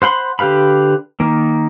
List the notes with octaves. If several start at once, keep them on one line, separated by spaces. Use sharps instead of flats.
C5 F#5 B5 C6
D3 G4 B4 F5 B5
D#3 A#3